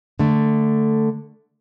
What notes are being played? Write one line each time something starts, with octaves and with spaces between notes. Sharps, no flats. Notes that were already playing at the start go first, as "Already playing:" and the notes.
D3 A3